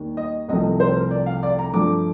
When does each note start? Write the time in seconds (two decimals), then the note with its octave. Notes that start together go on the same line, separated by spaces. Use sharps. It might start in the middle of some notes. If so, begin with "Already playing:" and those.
Already playing: D#2 D#3 G3
0.17 D#5
0.48 C2 C3 F3 A3 D#5
0.80 C5
0.96 A#4
1.11 D5
1.26 F5
1.43 D5
1.59 A#5
1.73 G2 F3 A3 D6